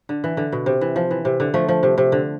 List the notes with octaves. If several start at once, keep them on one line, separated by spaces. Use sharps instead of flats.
D3
E3
D3
B2
C3
E3
F3
E3
C3
D3
F3 A3
F3
C3
C3
D3